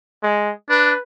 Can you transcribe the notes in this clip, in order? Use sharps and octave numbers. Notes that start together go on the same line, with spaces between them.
G#3
D4 B4